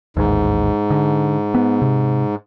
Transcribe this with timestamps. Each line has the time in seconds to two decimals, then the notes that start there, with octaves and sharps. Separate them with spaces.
0.17 A1 D#2 G#2
0.91 D3
1.55 B3
1.82 C3